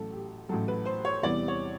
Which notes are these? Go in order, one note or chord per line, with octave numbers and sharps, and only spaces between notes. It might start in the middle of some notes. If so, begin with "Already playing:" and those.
Already playing: A1 A2 F#3 A4
G4
A1 A2 F#3 A4
B4
C5
C#5
E2 C3 E3 G3 B3 D5
C#5